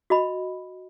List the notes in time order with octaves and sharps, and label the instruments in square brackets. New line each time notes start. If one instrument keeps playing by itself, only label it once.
[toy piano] F#4 D#5 B5